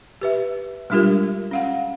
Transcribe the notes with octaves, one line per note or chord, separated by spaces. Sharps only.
G4 B4 E5
G3 G#3 D4 F4 G4 A#4
C#4 F5 F#5